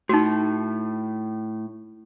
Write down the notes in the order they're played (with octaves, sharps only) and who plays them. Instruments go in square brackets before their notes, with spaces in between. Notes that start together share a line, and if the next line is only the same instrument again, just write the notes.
[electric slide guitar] A2 [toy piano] D#4 F#4